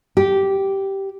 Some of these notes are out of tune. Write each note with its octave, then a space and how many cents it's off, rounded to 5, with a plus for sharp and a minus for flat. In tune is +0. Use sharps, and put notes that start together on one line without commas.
G4 -10